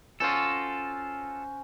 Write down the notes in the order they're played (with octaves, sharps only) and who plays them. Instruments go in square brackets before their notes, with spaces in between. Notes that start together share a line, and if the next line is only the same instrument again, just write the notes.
[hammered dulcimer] C#4 F#4 C5 [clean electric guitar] F4 A4